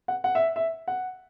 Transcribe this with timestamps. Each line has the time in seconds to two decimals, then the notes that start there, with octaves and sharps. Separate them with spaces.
0.08 F#5
0.24 F#5
0.35 E5
0.56 E5
0.88 F#5